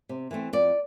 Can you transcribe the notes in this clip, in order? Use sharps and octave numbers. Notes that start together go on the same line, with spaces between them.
C3
E3 A3 C4
F2 D5